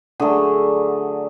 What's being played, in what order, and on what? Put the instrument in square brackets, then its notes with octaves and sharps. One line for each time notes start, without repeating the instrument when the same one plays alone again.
[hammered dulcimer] D3 F#3 A3 G#4